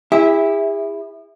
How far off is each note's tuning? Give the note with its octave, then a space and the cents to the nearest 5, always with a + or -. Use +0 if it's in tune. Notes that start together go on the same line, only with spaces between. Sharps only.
E4 +0 G#4 -45 E5 -15